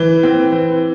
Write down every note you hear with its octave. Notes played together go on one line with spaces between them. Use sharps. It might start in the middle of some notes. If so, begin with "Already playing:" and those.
Already playing: E3
C4
E3